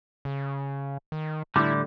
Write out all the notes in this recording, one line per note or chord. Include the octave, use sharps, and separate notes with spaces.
C#3
D#3
A2 D3 G3 E4